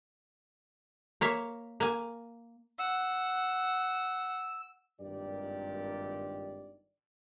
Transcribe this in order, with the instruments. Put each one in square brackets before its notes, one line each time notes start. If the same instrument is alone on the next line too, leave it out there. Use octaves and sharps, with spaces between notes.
[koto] A#3 C#5 E5
A#3 G#5
[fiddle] F#5 [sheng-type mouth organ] E6
[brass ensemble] G#1 G2 A#2 D#3 G4 D5